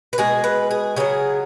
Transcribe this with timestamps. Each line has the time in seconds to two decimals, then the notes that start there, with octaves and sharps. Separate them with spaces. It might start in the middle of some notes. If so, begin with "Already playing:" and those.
0.13 B4
0.18 B2 G#3 G#4
0.44 B4
0.71 G#4
0.96 C#3 F#3 G#4